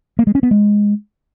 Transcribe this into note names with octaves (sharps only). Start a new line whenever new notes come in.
A#3
G#3
C#4
B3
G#3